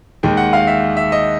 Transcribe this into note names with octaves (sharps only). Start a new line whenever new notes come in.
D#2 D#3 G#3 G5
F#5
F5
E5
E5
D#5